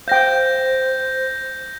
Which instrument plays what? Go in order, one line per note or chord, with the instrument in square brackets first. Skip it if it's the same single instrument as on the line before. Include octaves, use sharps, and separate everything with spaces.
[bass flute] C5 [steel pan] F5 G5 [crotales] G6 A#6